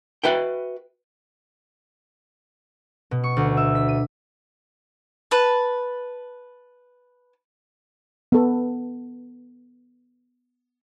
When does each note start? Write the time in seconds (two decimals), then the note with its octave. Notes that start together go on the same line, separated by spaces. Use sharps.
0.24 F#4 B4 E5 G5
3.11 B2
3.24 C#6
3.37 D2
3.57 E5
3.75 B6
3.89 D#7
5.31 B4 A5
8.32 B3 A4